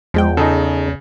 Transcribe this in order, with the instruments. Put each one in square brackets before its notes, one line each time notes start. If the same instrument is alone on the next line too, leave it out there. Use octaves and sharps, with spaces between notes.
[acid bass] E2 [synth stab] F3 G#3 G5
[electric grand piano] C#3 [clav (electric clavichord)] D#4 G#4 A4